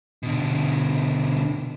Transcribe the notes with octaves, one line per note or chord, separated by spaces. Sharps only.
B2 D3